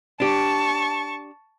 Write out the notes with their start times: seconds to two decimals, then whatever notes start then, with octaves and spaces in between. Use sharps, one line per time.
0.20 D4 G4 A5 C#6